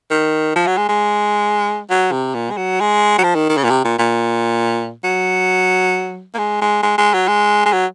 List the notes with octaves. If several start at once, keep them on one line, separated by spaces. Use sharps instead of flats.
D#3
F3
F#3
G#3
G#3
F#3
C3
A#2
G#3
F#3
G#3
F#3
F3
D#3
D#3
C#3
A#2
C3
A#2
A#2
F#3
A#3
G#3
G#3
G#3
G#3
F#3
G#3
G#3
F#3